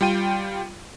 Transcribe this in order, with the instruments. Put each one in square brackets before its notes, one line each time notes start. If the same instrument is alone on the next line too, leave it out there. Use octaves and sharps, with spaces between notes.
[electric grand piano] G3 F4 G5 D#7